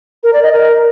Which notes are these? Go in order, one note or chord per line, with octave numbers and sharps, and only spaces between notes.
A#4
D5
D#5
A#4